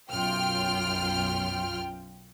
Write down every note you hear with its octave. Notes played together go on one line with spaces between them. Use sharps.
B1 F#2 F4 G5 F6